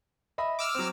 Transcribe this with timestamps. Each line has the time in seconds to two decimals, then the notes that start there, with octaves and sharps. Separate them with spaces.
0.38 D#5 E5 B5
0.59 D6 E6 F6
0.75 F#3 C4